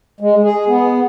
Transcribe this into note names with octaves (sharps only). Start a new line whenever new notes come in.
G#3
G#4
B3